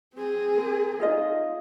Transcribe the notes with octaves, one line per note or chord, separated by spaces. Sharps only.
C4 G#4
A#4
D#4 F4 D#5